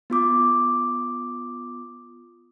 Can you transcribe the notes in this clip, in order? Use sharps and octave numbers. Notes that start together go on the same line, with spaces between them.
B3 F4 D6 D#6